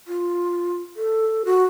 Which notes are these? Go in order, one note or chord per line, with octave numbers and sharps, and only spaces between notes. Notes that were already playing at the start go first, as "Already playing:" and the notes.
F4
A4
F#4